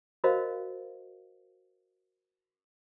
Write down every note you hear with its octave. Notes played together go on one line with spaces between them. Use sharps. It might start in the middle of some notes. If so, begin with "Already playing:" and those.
F#4 A#4 C5 D#5 F5